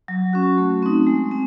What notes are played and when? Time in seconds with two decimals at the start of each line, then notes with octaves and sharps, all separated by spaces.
0.08 F#3
0.33 C#4 F#4
0.57 A3
0.83 C4 D#4
1.07 G#3
1.31 C4